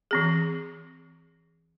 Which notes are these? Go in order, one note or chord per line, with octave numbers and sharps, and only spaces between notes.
E3 C4 G#4